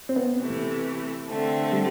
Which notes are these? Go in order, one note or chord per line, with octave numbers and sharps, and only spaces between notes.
C4
B3
C3 E3 A3
D3 A3 C4
G3